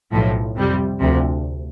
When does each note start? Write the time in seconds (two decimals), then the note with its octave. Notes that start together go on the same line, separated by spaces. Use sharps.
0.12 B1 A2 F3
0.56 F2 C3 G3
1.00 D2 C3 F3